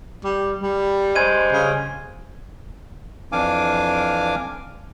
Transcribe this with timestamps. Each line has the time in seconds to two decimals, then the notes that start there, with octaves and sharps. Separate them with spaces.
0.24 G3
0.62 G3
1.16 G2 G#3 C5 G#5 G#6 D#7
1.52 C#3
3.32 F2 E3 D4 F5 G#5 D6